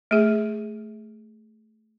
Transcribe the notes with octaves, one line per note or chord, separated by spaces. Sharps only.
A3 G#4